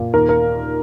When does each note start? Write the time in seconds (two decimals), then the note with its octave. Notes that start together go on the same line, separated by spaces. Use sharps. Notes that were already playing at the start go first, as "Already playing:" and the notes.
Already playing: A#2
0.14 D#2 A#4
0.29 A#4